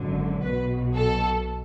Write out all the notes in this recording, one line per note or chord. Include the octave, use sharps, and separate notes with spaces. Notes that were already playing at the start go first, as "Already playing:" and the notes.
Already playing: G#1 F#2 D3
B1 B2 B4
A4